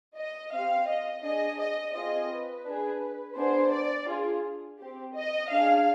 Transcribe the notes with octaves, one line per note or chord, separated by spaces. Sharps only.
D#5
C4 G4 F5
D#5
D4 G#4 D#5
D#5
C4 F4 G#4 D#5
B4
D4 G#4
B3 D4 G#4 C5
D5
D4 F4 G#4
C4 G4
D#5
D4 G#4 F5